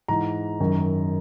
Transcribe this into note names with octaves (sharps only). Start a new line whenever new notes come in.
G#2 E3 A#5
F#2 D#3